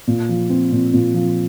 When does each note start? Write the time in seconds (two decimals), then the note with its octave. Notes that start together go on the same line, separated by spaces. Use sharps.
0.07 A#2
0.29 F3
0.50 C4
0.72 A#2
0.93 A#2
1.14 F3